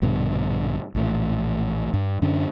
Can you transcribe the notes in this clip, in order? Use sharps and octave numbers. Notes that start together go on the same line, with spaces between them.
A#1 G2 B2 D3
A#1 A2 E3
G2
F#2 D3 C#4 D4